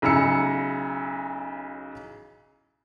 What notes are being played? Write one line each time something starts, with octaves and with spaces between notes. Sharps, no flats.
B1 C#3 E4 A#5 E6 C#7